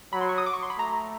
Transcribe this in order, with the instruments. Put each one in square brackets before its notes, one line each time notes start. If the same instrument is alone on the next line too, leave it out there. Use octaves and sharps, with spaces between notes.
[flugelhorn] F#3 [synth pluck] B5
[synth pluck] C6
C#6
D#6
D6
C#6
C6
B5
[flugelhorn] A3 [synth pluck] A#5